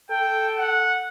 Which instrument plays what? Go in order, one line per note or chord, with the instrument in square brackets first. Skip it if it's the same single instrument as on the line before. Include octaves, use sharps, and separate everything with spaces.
[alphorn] A4 [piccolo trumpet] G5
[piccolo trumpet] F#5